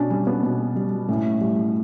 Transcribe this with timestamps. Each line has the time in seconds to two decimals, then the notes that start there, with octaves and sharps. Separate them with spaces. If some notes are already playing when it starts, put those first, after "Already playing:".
Already playing: B2 C#4 D4
0.10 G3 C#4
0.27 B3
0.43 B2
0.76 G3
1.09 A2 C#4
1.41 G3